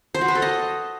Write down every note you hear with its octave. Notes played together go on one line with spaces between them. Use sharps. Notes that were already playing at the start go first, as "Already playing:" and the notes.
C5
F#4
B4
A4
D#5